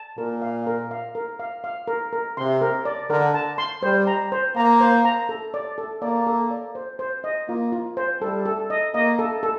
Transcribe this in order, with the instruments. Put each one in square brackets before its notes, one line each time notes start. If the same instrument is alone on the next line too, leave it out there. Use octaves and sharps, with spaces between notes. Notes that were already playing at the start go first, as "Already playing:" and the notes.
Already playing: [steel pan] A5
[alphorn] A#2 [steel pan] A#4
[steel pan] F5
A#4
F5
A#4
F5
F5
A#4
A#4
[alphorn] C3 [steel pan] C6
[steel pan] A#4
D5
[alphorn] D3 [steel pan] A#4
[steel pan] A5
C6
[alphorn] G3 [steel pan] C5
[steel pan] A#5
C5
[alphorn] A#3 [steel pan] A#5
[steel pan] C5
A#5
A4
D5
A4
[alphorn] A#3 [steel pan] D5
[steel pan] A4
D5
C5
C5
D#5
[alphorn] A#3 [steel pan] F4
[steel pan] F4
C5
[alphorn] G3 [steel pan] A4
[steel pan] A4
D#5
[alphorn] A#3 [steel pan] D#5
[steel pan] A4
A4